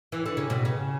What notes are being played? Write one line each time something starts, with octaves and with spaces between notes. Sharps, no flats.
E3
D3
C#3
B2
C#3